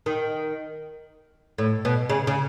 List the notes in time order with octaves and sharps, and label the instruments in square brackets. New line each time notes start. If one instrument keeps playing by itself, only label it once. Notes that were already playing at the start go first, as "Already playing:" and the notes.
[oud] D#3
A2
B2
C#3
C#3